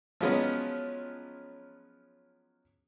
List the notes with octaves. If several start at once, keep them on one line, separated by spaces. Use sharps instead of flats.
F3 F#3 G#3 B3 C#4